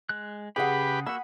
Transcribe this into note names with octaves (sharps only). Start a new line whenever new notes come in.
G#3 F#6
C#3 G4 G#4 B4 F#5 B5
A#3 F#4 B5 E6